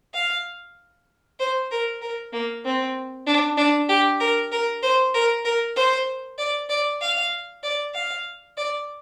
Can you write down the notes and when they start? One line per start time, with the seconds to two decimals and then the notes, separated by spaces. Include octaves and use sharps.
0.14 F5
1.39 C5
1.71 A#4
2.01 A#4
2.32 A#3
2.65 C4
3.27 D4
3.57 D4
3.89 G4
4.20 A#4
4.52 A#4
4.82 C5
5.14 A#4
5.45 A#4
5.76 C5
6.38 D5
6.69 D5
7.01 F5
7.63 D5
7.94 F5
8.57 D5